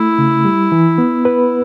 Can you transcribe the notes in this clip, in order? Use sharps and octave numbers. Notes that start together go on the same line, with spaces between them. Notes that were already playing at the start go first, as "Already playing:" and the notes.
Already playing: A3 E4
C#3
G3
E3
B3
B4